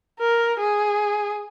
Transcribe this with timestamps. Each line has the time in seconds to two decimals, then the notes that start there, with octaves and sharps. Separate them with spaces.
0.19 A#4
0.59 G#4